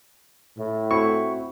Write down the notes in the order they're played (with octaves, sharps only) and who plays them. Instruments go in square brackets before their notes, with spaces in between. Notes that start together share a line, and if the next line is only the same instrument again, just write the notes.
[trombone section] A2
[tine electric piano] C4 E4 F#4 [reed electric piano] C#6